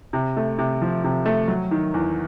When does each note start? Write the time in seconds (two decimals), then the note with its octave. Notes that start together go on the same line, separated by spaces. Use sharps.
0.13 C3
0.37 A3
0.58 C3
0.82 F3
1.04 C3
1.26 A3
1.48 F#3
1.71 D#3
1.94 E2